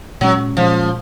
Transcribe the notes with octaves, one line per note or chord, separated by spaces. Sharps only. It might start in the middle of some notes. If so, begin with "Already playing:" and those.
A#2 F#3 G#3 C#4
A#2 F3 G#3 C#4